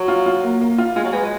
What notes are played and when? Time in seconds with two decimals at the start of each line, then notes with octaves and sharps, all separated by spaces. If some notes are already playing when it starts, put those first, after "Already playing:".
Already playing: F#3
0.08 F4
0.26 F4
0.44 A#3
0.61 A#3
0.78 F4
0.96 G#3 F4
1.04 F#3
1.12 G#3 B4